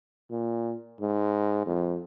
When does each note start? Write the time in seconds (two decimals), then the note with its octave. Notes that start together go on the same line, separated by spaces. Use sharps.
0.31 A#2
1.01 G#2
1.66 F2